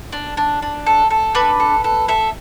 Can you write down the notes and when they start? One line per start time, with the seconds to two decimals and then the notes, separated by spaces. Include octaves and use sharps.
0.12 D4
0.37 D4
0.62 D4
0.87 A4
1.11 A4
1.35 D4 B4
1.60 A4
1.84 A4
2.08 A4 E5